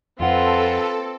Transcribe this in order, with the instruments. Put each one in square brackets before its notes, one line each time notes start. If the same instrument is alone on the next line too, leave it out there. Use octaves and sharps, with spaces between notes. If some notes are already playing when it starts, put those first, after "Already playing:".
[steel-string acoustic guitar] F2 F#5 [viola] C4 [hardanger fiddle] F4 B4 [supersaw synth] A4